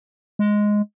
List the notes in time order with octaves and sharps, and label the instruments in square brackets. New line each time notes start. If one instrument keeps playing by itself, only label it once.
[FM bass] G#3